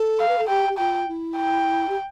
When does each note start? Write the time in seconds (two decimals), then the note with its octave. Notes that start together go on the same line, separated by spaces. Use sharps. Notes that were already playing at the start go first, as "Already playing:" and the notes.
Already playing: A4
0.20 F5
0.28 B4
0.39 A4
0.48 G4 G5
0.69 G4
0.78 F4 G5
1.08 E4
1.37 G5
1.89 G4